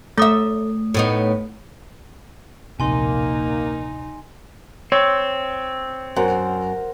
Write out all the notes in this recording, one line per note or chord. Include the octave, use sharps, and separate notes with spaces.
A3 A4 E5 D#6
A2 B3 D#4
D1 A#1 C3 A#3 D#4 G#5 C6
C4 C#5
F#2 A#4 C5 F#5